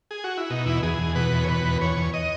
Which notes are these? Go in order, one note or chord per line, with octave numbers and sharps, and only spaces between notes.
G#4
F#4
E4
B2 D#4
E2 E4
E2 G#4
E2
B2 B4
E2
C#5
B2 B4
E2
E2 C#5
E2
D#5